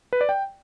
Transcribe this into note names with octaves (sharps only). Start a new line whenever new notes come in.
B4
D5
G5